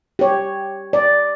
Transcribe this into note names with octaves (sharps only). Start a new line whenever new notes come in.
G4 C#5
D5